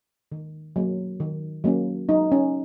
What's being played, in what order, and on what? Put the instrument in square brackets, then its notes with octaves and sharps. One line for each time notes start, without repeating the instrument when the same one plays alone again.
[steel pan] D#3
F#3 A#3
D#3
F#3 A#3 C#4
F#3 D#4
C#4